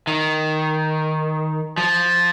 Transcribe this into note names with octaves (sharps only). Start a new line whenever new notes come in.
D#3
F3